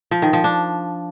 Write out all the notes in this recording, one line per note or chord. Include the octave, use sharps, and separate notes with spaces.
F3
D#3
F3
D4